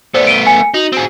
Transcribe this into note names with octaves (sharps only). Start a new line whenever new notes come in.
A3 B3 C5 D5
D7 D#7 G7
G#5 C#7
D#4 F#4 F#7
C4 G#4